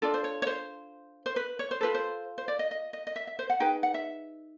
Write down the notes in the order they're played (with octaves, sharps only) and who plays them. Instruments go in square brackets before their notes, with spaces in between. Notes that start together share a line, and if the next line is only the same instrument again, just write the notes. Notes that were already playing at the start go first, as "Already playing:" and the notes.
[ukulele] D4 F4 A4 D5
C5
C#5
C#5
C5
C5
B4
C#5
C5
F4 A4 B4
C5
C5
D5
D#5
D#5
D#5
D#5
E5
E5
C5
F#5
D#4 G#4 B4 G5
F#5
E5